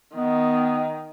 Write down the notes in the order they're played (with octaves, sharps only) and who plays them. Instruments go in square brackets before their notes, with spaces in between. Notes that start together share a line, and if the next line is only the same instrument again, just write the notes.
[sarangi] D#3 [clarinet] B3